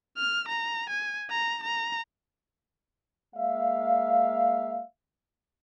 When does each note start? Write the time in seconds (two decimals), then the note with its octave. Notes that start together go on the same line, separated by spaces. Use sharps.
0.17 F6
0.49 A#5
0.90 G#5
1.30 A#5
1.63 A#5
3.36 G#3 A#3 E5 F5